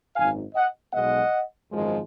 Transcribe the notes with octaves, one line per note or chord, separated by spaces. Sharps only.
G#1 F#2 D#3 F5 G#5
D#5 F#5
B1 B2 G#3 B3 D#5 F#5
G#1 F#2 F3 G#3